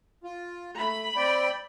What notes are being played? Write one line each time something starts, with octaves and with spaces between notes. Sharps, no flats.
F4
A3 B5
C4 D5 G5